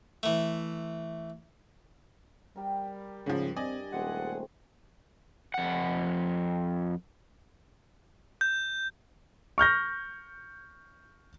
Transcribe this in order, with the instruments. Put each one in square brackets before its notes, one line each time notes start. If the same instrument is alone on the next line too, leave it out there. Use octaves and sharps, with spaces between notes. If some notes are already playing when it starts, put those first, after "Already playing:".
[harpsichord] E3 A3
[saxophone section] G3 [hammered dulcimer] A#4 G5 B5
[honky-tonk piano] G#2 F3 [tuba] C#3
[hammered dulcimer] G2 [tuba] C4 [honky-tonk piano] D5 D#5 G#5
[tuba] D#1 [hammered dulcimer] G#3 A3 C4 [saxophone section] G#4 F#5
[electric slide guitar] F2 F#5
[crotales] G6
[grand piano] C#6 F6 G6 A#6